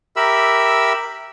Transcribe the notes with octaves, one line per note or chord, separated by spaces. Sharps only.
G4 A#4 E5 B5 E6